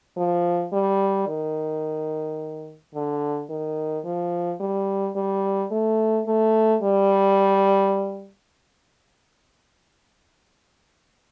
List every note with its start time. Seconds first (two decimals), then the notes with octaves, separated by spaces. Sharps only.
0.17 F3
0.73 G3
1.27 D#3
2.94 D3
3.49 D#3
4.05 F3
4.60 G3
5.16 G3
5.71 A3
6.26 A3
6.82 G3